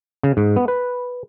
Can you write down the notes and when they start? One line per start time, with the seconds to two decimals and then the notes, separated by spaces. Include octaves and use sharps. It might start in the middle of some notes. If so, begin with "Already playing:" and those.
0.23 C#3
0.37 G#2
0.56 B3
0.68 B4